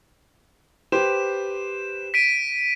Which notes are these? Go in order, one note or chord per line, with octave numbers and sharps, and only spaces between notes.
G4 B4 C5 E7
B6 D7 D#7